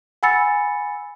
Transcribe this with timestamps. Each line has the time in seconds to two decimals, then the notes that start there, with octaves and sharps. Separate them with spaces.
0.23 F#5 G#5 B5 E6 A6 C#7